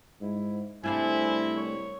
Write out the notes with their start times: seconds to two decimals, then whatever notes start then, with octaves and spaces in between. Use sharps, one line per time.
0.21 G#2 E4
0.83 C2 A3 C4 D4 E4 F5 G#5
1.57 C#5